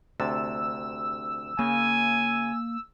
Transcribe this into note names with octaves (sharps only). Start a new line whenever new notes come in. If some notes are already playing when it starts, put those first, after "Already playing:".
D2 C3 A5 E6
C#3 A#3 G#5